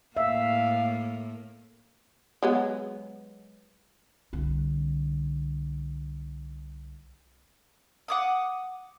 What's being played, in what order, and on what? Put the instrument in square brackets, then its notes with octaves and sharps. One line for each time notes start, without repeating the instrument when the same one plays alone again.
[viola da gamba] A2 A#3 [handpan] E5 [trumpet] F5
[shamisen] F#3 G#3 B3
[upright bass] C2 D3
[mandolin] F#5 D6 D#6